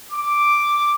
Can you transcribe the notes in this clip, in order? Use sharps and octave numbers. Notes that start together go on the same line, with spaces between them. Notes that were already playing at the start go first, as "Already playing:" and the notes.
D6